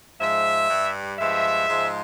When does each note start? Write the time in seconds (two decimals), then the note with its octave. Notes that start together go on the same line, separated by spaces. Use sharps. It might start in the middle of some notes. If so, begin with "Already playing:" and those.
0.21 G#2 F3 G#3 E5
0.70 G2 G3
1.19 G2 F3 G#3 E5
1.68 G#2 F3 G#3